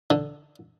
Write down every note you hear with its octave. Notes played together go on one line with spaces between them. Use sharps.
D3